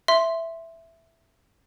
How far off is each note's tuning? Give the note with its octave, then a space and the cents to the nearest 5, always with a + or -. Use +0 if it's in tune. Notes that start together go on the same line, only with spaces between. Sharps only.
E5 +5 C6 +0